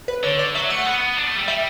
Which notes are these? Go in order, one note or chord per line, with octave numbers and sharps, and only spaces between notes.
B4
D3 C#5
D5
F#3 E5
A3 F#5
B3
D4
A3
G3
G3 E5